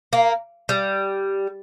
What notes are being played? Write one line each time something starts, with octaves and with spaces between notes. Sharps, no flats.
A#3
G3